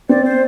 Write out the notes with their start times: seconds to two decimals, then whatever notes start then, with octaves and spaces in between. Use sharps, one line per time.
0.09 C4 D5
0.25 C5